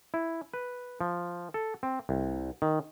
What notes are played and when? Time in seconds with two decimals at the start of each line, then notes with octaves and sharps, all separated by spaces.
0.14 E4
0.54 B4
1.01 F3
1.54 A4
1.83 C4
2.09 C2
2.62 D#3